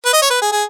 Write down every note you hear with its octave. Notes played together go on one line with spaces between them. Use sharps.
B4
D#5
C#5
B4
G#4
G#4